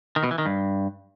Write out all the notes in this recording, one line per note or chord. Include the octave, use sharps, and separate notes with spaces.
D#3
B2
E3
D#3
G2